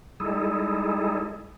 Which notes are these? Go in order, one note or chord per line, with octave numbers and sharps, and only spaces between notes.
G3 G#3 D#4 E4 G#4 A4